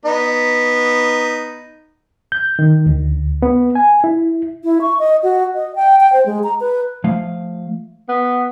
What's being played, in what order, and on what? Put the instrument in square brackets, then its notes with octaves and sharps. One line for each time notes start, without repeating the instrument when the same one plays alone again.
[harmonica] B3 D#4
[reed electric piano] G6
D#3
D2
B3
G#5
E4
[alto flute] E4
C#6
D#5
F#4
D#5
G5
G5
C5
G#3
A#5
B4
[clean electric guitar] F3 A3 F5
[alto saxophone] B3